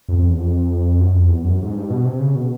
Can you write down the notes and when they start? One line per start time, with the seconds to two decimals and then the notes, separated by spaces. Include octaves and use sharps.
0.08 F2
0.19 F2
0.29 E2
0.39 F2
0.99 F#2
1.14 F2
1.29 E2
1.44 F#2
1.63 G#2
1.75 G2
1.90 B2
2.05 C3
2.20 C#3
2.35 B2